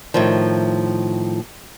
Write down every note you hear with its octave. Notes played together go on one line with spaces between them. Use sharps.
A2 D#3 F3